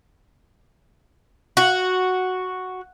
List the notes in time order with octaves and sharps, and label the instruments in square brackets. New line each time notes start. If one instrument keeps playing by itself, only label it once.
[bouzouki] F#4